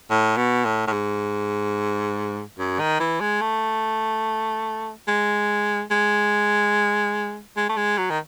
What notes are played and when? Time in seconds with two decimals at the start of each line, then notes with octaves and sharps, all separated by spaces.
0.10 A2
0.37 B2
0.65 A2
0.87 A2
0.92 G#2
2.58 F#2
2.79 D#3
3.00 E3
3.20 G#3
3.41 A3
5.08 G#3
5.91 G#3
7.57 G#3
7.69 A3
7.77 G#3
7.98 F#3
8.10 D#3